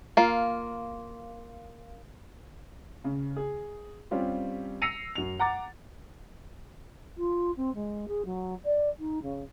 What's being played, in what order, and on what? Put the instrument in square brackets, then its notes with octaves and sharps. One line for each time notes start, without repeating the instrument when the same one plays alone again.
[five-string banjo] A#3 F4
[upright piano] C#3
G#4
G3 C4 C#4 F4 G4
E6 A#6 C7 C#7 D#7 F7
F#2 F7
F#5 A#5 D6 A6
[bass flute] F4
C4
G#3
G#4
F#3
D5
D#4
C#3